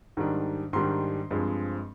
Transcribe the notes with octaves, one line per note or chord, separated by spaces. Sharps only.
G#2 D#3 G3 D4
G#2 D#3 G3 D4 C6
G2 F3 G#3 C4